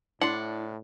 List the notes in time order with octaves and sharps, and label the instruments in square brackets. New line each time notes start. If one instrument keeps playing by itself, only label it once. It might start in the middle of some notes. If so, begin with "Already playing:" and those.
[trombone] A2 [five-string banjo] D4 [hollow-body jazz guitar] E4 D5 C6 [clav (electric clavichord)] F#5